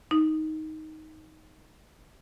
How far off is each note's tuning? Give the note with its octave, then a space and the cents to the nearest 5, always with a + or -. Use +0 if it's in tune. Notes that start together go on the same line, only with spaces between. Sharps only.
D#4 +10